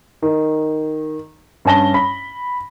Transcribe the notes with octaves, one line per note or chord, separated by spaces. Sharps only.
D#3
G2 C#4 A5 A#6 G7
B5